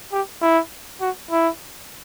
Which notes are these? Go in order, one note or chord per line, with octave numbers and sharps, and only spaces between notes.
G4
E4
F#4
E4